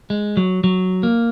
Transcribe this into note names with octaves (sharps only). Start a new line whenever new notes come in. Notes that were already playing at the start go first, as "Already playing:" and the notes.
G#3
F#3
F#3
A#3